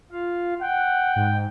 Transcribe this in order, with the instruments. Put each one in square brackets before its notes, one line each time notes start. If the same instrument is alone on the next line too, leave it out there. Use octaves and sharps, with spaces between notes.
[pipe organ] F4 F5
[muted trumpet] F#5 [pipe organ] G5
[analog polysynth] G#2